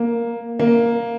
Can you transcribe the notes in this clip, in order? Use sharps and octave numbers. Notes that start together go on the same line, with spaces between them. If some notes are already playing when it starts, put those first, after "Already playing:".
Already playing: A#3
A#3